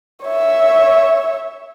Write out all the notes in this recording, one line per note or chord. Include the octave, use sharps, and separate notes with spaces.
C#5 E5